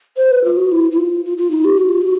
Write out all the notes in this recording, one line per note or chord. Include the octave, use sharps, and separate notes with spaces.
C5
B4
F4
F#4
E4
E4
F4
F4
F4
D#4
G4
F#4
F4
F#4